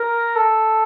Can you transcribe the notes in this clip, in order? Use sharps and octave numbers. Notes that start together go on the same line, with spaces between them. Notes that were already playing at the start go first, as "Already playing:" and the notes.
Already playing: A#4
A4